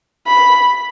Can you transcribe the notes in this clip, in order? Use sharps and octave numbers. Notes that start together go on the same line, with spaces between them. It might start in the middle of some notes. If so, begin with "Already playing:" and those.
B5